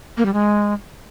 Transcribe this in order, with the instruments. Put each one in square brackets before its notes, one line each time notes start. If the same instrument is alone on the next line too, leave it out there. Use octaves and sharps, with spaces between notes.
[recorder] A#3
G3
G#3